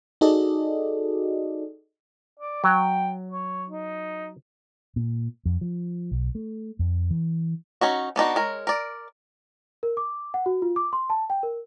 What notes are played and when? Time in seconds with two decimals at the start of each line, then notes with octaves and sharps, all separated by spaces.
0.21 D#4 F#4 G#4 A4 D5 D#5
2.40 D5
2.64 F#3 G5
3.32 C#5
3.70 D#4
4.96 A#2
5.45 F2
5.61 F3
6.11 B1
6.35 A3
6.79 F2
7.11 E3
7.81 C#4 D#4 F#4
8.16 B3 D4 D#4 F#4
8.36 G#3 A#4 C#5
8.67 A#4 D5
9.83 A#4
9.97 D6
10.34 F#5
10.46 F#4
10.62 F4
10.76 D6
10.93 C6
11.10 A5
11.30 G5
11.43 A#4